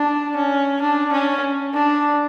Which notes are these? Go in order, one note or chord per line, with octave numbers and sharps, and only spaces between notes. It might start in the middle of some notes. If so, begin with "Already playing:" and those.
Already playing: D4
C#4
D4
C#4
D4